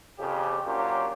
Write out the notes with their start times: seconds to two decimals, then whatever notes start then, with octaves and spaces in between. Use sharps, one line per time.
0.19 F2 C#3 G4
0.66 F#3 A#3 C#4 D4 F4 G4